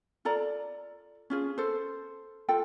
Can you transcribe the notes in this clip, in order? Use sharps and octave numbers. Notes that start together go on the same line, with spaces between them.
F4 A4 D5 A#5
C#4 F4 G#4
A4 C5
F4 A4 G5